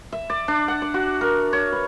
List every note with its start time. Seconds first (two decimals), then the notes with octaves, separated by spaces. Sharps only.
0.12 E5
0.30 D5
0.48 D4
0.68 F#5
0.82 D5
0.94 F#4
1.21 A#4
1.53 C#5
1.72 B4